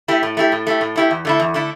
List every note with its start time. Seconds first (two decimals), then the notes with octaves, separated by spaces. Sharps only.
0.08 A3 E4 G4
0.23 A2
0.37 A3 E4 G4
0.52 A2
0.67 A3 E4 G4
0.81 A2
0.96 A3 E4 G4
1.11 E2
1.25 D3 A3 E4
1.40 E2
1.54 D3 A3 E4